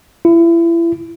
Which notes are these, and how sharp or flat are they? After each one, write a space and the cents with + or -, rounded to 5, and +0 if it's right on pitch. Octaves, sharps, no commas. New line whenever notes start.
E4 +30